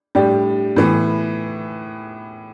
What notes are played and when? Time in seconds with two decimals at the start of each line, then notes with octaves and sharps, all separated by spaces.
0.15 A2 G3 D4 G4
0.76 A2 E3 B3